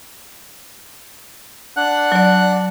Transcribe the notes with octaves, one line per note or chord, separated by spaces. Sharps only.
D4 F#5 F#6
F#3 D5